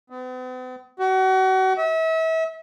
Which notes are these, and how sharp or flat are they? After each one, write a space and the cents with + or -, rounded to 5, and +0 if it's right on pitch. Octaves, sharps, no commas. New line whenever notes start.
B3 +45
F#4 +35
E5 -35